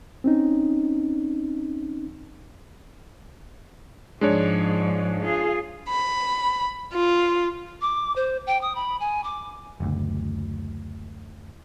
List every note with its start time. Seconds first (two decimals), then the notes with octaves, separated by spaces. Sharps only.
0.24 C4 C#4 D#4
4.21 G#2 F3 G#3 D4 C#5
5.22 F4 G#4
5.88 B5
6.93 F4
7.81 D6
8.16 C5
8.47 G5
8.62 D#6
8.75 B5
9.00 G#5
9.24 D6
9.80 F#1 D2